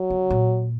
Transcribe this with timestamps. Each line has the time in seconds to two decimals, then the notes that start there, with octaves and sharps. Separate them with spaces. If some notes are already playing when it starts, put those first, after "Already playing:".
Already playing: F#3
0.10 C#3
0.30 A#2